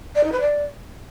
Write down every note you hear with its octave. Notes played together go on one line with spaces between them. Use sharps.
D5
D#4
B4
D5